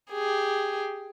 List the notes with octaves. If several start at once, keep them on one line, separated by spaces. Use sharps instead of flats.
G4 G#4